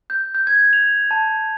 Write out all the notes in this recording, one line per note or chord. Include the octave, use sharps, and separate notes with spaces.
G6
G6
G#6
F7
A5